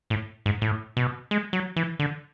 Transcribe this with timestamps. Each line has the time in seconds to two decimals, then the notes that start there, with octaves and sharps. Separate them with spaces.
0.10 A2
0.46 G#2
0.62 A2
0.97 B2
1.31 G#3
1.53 F#3
1.76 E3
1.99 D3